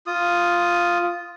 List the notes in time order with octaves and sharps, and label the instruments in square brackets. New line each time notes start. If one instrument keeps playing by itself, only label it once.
[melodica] F4 D#6